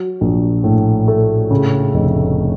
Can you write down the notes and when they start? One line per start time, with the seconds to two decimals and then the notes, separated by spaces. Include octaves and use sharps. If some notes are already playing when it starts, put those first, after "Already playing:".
Already playing: F#3
0.21 A#1
0.64 A2
1.08 A3
1.51 C#3
1.94 F1